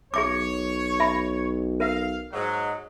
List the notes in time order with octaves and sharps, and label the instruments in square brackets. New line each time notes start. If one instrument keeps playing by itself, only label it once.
[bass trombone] B1 [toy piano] G#4 E5 D6 [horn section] C#5
[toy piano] E5 B5
[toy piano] A#4 E5 [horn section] F5
[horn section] G#2 F#3